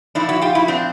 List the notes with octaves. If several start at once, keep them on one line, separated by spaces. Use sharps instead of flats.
A#2 F3 D4 E4
E4 F#4
F4 G4
E4 F#4
C4 D4